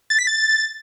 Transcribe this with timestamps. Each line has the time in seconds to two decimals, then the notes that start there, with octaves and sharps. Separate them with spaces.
0.10 A6
0.19 B6
0.27 A6